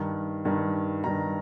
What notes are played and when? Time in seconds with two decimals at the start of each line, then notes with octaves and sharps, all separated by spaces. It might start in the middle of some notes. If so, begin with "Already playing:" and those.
Already playing: G2 D#3
0.45 G2 D#3
1.04 G2 D#3 A#5